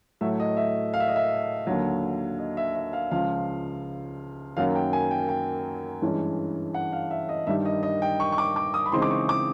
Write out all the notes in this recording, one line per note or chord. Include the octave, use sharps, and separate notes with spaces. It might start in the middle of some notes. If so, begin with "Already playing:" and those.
A2 F#3 A3 E5
D#5
E5
F5
E5
D#5
E5
D#2 D3 F#3
D#5
E5
E5
F5
C#2 C#3 F3 F5
F#2 D#3 F#3 A#3 F5
G5
G#5
G5
G5
G2 E3 G#3 C#4
F#5
F5
E5
D#5
G2 D#3 G3 E5
D#5
D#5
G5
C#6
C#6
D6
D6
D#6
B5
C#3 E3 G#3 C4 D#4 C6
D6
C#6
D6